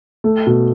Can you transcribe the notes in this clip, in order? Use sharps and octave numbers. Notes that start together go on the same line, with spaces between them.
A3
B2